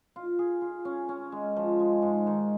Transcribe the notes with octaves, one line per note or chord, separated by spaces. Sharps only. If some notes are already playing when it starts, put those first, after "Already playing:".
F4
G#4
F4
C#4
C#4
G#3
F3
G#3
G#2
D#3